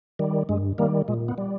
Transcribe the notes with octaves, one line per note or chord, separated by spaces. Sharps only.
D#3 G3
G2 G#3
D#3 G3 A#3
A#2 G#3
B3
G3